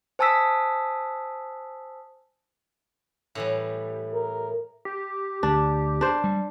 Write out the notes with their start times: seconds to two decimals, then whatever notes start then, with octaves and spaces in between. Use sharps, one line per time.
0.19 C5 G#5 A5 D#6 E6 B6
3.35 A2 E3 G3
4.14 A#4
4.85 G4
5.43 D2 D4
6.01 D4 C5
6.24 G3